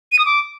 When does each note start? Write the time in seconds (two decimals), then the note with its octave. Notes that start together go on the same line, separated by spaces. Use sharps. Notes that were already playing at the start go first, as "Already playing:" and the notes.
0.12 D#7
0.19 D#6
0.25 D6